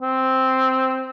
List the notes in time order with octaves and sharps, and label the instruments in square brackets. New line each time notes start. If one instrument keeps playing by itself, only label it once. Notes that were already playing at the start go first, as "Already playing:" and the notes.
[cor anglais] C4